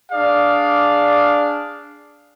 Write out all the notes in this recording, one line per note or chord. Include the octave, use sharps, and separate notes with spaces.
D4 G#4 D5 F5